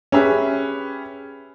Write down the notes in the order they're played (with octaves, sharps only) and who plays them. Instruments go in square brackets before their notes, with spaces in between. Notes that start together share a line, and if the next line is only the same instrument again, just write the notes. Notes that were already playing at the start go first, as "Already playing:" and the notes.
[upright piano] C#4 G4 G#4 B4 E5